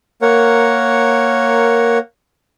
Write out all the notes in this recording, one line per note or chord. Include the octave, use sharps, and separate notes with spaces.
A#3 A#4 C#5 F#5